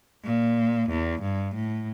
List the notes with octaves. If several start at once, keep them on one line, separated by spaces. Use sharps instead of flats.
A#2
E2
G2
A2